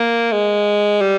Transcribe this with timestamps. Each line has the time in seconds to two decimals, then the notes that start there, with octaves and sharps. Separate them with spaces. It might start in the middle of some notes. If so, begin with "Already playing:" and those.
Already playing: A#3
0.32 G#3
1.01 G3